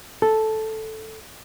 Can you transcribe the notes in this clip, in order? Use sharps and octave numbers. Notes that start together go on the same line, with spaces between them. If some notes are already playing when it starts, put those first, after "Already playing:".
A4